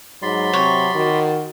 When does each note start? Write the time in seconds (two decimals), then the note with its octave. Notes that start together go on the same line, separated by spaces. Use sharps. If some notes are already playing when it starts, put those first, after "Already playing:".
0.22 G#2 F#3 D5 B5 C6
0.53 C3 C#5
0.95 D#3 F#4